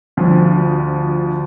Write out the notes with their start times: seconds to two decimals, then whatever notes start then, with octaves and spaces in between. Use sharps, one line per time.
0.17 D2 F3